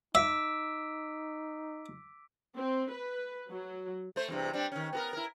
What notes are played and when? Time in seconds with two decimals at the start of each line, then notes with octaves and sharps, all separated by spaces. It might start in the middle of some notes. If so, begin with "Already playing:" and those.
0.15 D#4 E5 D6 E6 B6 D7
2.57 C4
2.91 B4
3.51 F#3
4.16 A3 C5
4.28 E2 G2 C3
4.53 G3 C4 D4
4.72 D#3 C#4
4.93 B3 F#4 A#4
5.13 E4 A#4